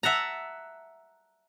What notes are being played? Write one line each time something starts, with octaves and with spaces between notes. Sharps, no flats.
E5 F#5 A5 A#5